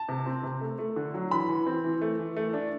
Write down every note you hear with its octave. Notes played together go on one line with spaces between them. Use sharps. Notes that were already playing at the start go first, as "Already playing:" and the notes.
Already playing: A5
C3
C4
C3
A3
A3
D3
F#3
E3 B5
E3
C4
E3
A3
E3
A3
D4